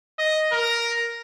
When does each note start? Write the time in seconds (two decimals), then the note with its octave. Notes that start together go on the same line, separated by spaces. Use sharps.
0.19 D#5
0.52 A#4